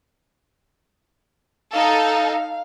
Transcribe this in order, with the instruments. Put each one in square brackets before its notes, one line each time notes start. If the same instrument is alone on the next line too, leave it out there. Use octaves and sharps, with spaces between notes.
[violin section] D#4 A4 [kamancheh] F5